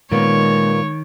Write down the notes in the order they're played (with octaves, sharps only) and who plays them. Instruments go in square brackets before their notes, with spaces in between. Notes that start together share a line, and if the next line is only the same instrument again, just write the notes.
[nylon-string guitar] A#2 A#3 B3 [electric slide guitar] D#3 [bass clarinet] G#3 [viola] C#5